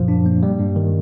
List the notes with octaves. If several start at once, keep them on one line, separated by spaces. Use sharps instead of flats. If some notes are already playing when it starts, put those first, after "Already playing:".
Already playing: F#2 A#2 F3
D4
A#3
G3
G2
D#3